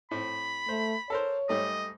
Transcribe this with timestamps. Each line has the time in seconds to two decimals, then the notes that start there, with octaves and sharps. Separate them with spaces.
0.11 A2 C4 B5
0.69 A3 C5
1.10 A4 A#4 C5 C#5
1.49 G#2 G3 A3 D#5